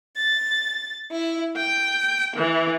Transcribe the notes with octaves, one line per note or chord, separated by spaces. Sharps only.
A6
E4
G5
E3